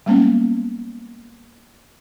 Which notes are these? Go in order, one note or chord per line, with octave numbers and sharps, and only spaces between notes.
G3 G#3 A#3 B3 C#4